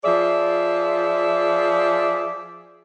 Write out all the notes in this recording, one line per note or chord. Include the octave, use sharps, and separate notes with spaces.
F3 G#4 D5 E5